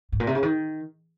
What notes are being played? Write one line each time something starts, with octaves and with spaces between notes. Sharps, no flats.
G#2
A#2
C3
C#3
D#3